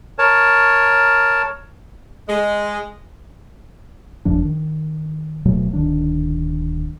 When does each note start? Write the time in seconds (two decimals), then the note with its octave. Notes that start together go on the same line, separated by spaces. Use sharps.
0.19 A#4 C#5 A5
2.28 G#3
4.25 F#1 E2 F3 D4
4.44 D#3
5.45 D1 B2 F#3 A3
5.73 D1 A#1 D#3 D4